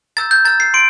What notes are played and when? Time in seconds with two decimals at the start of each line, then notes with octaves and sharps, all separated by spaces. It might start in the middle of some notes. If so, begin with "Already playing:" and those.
0.17 A#5 E6 G6 A6
0.31 G6
0.45 A#5 F6 A6
0.60 C7
0.74 C6 D7